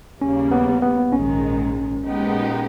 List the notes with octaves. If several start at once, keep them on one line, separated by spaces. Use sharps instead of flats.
D#2 C#3 G3 A#3 C#4
B3
B3
A#1 G#2 D#3 G#3 C#4
A#2 G#3 B3 D#4 G4